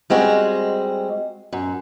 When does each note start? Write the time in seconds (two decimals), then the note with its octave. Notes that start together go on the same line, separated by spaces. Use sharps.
0.10 G3 G#3 C4 F#4
1.53 F#2